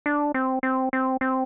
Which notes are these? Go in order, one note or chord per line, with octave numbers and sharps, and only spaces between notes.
D4
C4
C4
C4
C4